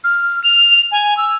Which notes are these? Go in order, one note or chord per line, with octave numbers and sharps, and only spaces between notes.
F6
F7
G#5
E6